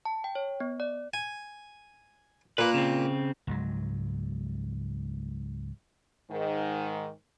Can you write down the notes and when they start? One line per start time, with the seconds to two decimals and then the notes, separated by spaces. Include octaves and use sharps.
0.05 A5
0.24 G5
0.35 C#5
0.60 B3
0.80 D5
1.14 G#5
2.58 A#2 A#3 B4
2.74 C#3 C4
3.47 C#2 G#2 F#3
6.31 G#2 D#3